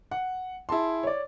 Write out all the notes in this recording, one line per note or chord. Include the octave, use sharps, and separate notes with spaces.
F#5
E4 G#4 A5 C6
C#5 D5